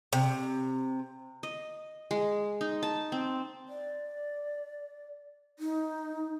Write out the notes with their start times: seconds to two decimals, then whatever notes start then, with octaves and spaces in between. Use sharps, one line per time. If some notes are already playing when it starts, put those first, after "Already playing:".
0.13 C3
1.43 D#5
2.11 G#3
2.61 D#4
2.83 A5
3.12 C4
3.69 D5
5.59 D#4